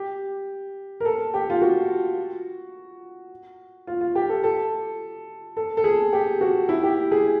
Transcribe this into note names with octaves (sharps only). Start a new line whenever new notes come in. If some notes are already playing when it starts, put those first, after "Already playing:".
Already playing: G4
A#4
A4
G4
F4
F#4
F4
F4
G4
A4
A4
A4
A4
G#4
G4
F#4
E4
G4
G#4